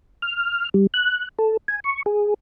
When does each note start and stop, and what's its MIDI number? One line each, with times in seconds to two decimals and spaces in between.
0.22 0.69 89
0.74 0.87 55
0.94 1.28 90
1.39 1.57 69
1.68 1.80 80
1.84 2.03 85
2.06 2.34 68